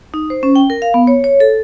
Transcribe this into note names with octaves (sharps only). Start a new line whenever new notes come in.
D#4
C5
C#4
G5
A#4
F5
B3
C#5
C#5
A4